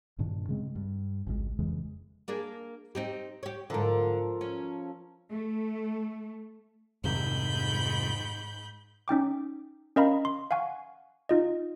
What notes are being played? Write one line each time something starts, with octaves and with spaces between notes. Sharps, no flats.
G2 A#2 D#3 D4
C#3 G#3 C4
G2
G#1 C#2 C3 G#3
F2 C#3 E3 G#3
A#3 D4 G#4
C4 D#4 G4
G4 C#5
G#2 D3 F3 A4 A#4
C#4
A3
F2 G#2 C3 D#3 B5 G6
C#4 D#4 G5 D6
C#4 A#4 D#5 F5 A#5 B5
C6
F5 F#5 G#5 C#6
D#4 F4 D#5